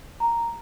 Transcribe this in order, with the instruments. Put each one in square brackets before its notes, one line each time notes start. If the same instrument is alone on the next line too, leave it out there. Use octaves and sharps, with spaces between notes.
[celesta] A#5